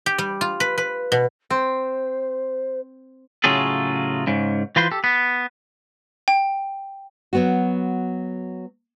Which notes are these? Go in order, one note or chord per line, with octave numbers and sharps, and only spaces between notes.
G4
G3
F4
B4
B4
B2
C4 C5
A2 C#3 F#3 F4 G#4 A4
G#2 C#3
E3 F4 B4 C5 C6
G4 A4
B3
G5
F#3 B3 F#4